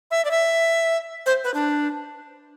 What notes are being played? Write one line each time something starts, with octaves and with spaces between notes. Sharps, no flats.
E5
D5
E5
C5
B4
D4